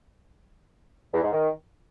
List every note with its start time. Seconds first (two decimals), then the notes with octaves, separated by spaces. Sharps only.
1.14 E2
1.23 G#2
1.32 D#3